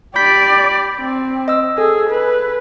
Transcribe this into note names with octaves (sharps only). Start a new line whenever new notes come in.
G4 D5 B5 G6 B6
C4
D#5 E6
G#4 A4
B4